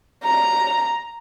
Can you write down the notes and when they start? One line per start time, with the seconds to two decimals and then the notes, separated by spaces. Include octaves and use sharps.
0.24 A#5